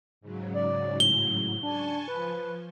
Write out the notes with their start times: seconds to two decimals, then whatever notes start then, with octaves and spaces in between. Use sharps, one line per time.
0.21 G#2 C#3 F#3
0.54 D5
1.00 A2 G7
1.63 D4 G#5 A5 C#6
2.08 F3 B4